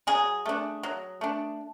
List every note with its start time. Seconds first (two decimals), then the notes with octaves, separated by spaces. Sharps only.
0.07 F#3 G#4
0.46 A3 D4
0.83 F#3
1.21 A3 D4